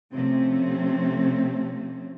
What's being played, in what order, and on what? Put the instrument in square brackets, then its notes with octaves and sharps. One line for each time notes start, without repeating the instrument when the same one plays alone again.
[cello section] C3 F3 A3 C4 C#4